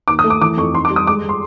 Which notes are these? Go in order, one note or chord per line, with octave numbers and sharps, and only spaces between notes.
D#2 D6
D#6
A3
D6
E3 D6
F2 C#6
D#4 C6
D6
G3
D#6
G#3 D6
G#3
C6